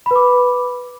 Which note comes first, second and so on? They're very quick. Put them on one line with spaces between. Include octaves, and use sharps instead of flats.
B5 B4 D6